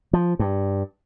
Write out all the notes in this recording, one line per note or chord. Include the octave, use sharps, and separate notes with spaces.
F3
G2